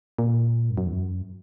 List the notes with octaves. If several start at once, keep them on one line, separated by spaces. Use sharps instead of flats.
A#2
G2
F#2
E2
F#2